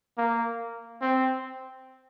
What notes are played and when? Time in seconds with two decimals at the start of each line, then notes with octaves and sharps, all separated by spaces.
0.18 A#3
1.02 C4